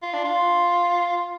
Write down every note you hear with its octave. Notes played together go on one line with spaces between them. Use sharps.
F4
D4
F4